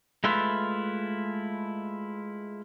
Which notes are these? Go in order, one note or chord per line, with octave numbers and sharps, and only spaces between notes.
G#3 A3 E4 F4 B4 E5